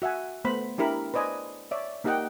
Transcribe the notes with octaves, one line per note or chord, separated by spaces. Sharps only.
F#4 E5 F#5 G#5
A3 B3 C5 B5
D4 E4 G4 A#4 B5
B4 C5 D5 D#5 G#5
C#5 D5 E5
A#3 D#4 G4 D#5 F#5 G5